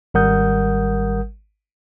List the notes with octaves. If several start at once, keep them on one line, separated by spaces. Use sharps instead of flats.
G#1 G3 A#4 F#5 D#6 G6